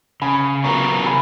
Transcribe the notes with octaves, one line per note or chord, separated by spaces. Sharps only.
C#3 G#5 B5
F#3 B3 F4 A#4 A#5 C#6
C#3 G#5 B5